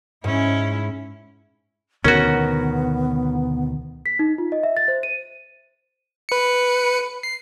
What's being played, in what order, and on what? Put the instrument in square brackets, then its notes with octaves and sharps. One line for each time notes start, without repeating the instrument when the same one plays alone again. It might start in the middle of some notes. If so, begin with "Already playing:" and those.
[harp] G#2 [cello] C#4 E4
[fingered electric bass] D2 B2 D#3 [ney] B3 [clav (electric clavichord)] C#4 F#4 [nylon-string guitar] A#4
[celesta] B6
D#4
F4
D#5
E5
A6
C5
D#7
[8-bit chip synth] B4 C#7
C7